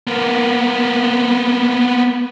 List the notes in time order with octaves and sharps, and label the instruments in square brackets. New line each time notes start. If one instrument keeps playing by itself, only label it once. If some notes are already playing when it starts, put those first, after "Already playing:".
[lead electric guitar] A#3 B3